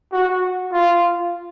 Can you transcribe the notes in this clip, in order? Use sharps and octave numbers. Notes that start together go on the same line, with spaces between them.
F#4
F4